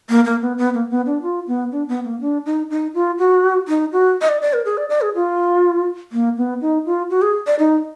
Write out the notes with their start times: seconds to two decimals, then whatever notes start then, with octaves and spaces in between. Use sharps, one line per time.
0.09 A#3
0.25 A#3
0.41 B3
0.58 B3
0.74 A#3
0.90 B3
1.06 D4
1.22 F4
1.47 B3
1.72 D4
1.88 B3
2.05 A#3
2.21 D4
2.46 D#4
2.70 D#4
2.94 F4
3.19 F#4
3.68 D#4
3.92 F#4
4.21 D#5
4.29 D5
4.41 D5
4.53 A#4
4.65 G#4
4.77 D5
4.90 D5
5.01 G#4
5.15 F4
6.12 A#3
6.37 B3
6.61 D#4
6.86 F4
7.10 F#4
7.22 G#4
7.47 D5
7.59 D#4